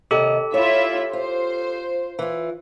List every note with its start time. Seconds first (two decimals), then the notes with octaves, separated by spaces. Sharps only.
0.11 D#2 C3 G4 A4 D#5
0.54 E4 F4 C#5 E5
1.13 F4 C5
2.19 E3 F4